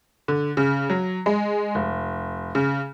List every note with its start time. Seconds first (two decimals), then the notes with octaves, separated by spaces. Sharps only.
0.28 D3
0.57 C#3
0.90 F#3
1.26 G#3
1.75 F1
2.55 C#3